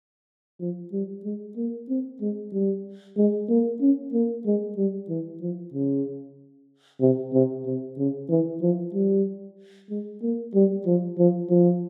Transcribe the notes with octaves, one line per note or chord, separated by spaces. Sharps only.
F3
G3
G#3
A#3
C4
G#3
G3
G#3
A#3
C#4
A#3
G#3
G3
E3
F3
C#3
C3
C3
C3
C#3
E3
F3
G3
G#3
A#3
G3
F3
F3
F3